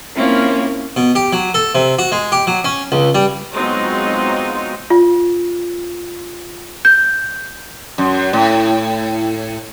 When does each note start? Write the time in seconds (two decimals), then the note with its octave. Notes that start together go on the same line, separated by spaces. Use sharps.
0.15 A#3 C4 C#4 E4 F4
0.96 B2
1.15 G4
1.33 F#3
1.54 A4
1.75 C3
1.99 F#4
2.12 G#3
2.32 G4
2.47 F#3
2.64 C#4
2.92 C#2
3.15 G3
3.54 F#3 G#3 B3 C4 D#4 F4
4.90 F4
6.85 G6
7.98 F#2
8.33 A2